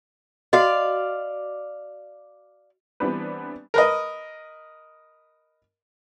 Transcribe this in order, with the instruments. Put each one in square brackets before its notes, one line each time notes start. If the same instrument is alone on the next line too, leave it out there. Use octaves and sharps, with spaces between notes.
[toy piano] F#4 D#5 [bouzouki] D5 F5
[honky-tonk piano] E3 G3 B3 C4 D4 B4
[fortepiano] A#4 B4 D#5